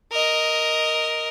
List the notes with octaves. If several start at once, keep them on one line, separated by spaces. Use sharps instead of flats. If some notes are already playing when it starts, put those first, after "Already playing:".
A#4 D#5